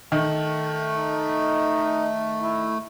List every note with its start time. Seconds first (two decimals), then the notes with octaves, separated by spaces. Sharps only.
0.12 D#3 A3
0.96 D#4
2.42 E4